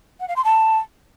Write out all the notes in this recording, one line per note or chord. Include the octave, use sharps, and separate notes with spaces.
F#5
F5
C6
A5